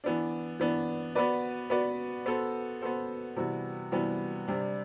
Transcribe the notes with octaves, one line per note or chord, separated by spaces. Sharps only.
E3 B3 D4
E3 B3 D4
B3 F#4 B4 D5
B3 F#4 B4 D5
B3 F#4 A4 C5
B3 F#4 A4 C5
C3 E3 G3 B3 F#4
C3 E3 G3 B3 F#4
C3 G3 D4